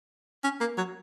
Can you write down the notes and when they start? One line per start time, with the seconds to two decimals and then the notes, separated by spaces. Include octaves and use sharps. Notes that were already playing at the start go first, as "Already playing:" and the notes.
0.44 C#4
0.60 A#3
0.77 F#3